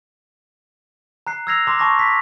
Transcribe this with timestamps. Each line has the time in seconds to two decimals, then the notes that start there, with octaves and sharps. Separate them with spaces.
1.27 A#5 F#6 C7
1.47 E6 F6 G#6 A#6 C7 F7
1.67 A#5 C6 D6
1.79 A5 C#6 D6 A#6
1.99 B6